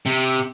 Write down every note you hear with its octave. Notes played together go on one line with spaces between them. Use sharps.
C3